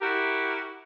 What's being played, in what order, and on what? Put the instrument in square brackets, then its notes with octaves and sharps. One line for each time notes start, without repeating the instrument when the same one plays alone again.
[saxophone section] E4 F#4 G4 A#4